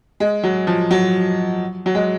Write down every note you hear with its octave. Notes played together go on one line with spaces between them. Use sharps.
G#3
F#3
F3
F#3
F#3
G#3